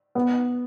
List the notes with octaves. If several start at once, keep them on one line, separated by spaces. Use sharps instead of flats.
B3